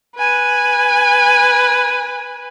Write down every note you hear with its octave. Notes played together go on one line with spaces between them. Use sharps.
B4 G#5